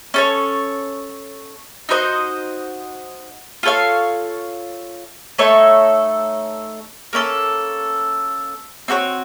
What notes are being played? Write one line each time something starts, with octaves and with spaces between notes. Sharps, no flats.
C#4 A4 C#5
D#4 F#4 C5 D#5
F4 A4 C#5 F5
A3 D#4 A4 C#5
A#3 C#4 A4
C4 F#4 A4 C#5